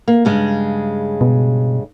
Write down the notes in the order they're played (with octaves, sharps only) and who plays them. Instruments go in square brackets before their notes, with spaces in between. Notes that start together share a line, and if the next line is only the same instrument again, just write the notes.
[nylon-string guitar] A#3
G2 C#3 G#3
[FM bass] B2